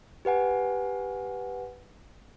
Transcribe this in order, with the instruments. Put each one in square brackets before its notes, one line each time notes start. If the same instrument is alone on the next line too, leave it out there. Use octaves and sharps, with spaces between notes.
[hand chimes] G4 B4 F#5 G#5